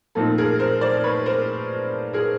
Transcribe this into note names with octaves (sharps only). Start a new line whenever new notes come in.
A#2 F3 A3 C4 D#4 A4
G#4 A#4
A#4 C5
C5 D5
B4 C#5
A#4 C5
G#4 A#4